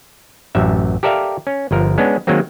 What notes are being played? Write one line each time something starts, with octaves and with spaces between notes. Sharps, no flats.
A1 F#2 E5
G4 A4 A#4 D5 E5 F5
C#4
G1 F3 A#4
G#3 B3 C#4 D4
D#3 F#3 G#3 A#3 C4